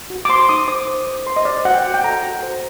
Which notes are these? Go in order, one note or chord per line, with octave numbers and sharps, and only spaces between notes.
F#4
D6
C5 C6
D#4 D#6
C5 D6
C5
C5
C5 C6
D#5
C5 D5
F#4 F#5
G5
F#4
G5
A4 A#5
F#4
C5